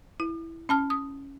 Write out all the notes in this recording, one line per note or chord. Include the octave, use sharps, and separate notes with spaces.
E4
C#4 A5 F6
D#6